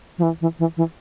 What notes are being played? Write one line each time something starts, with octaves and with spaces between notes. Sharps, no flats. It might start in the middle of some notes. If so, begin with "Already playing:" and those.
F3
E3
E3
E3
E3